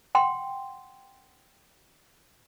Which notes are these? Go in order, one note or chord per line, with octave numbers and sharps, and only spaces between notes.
F#5 G5 C6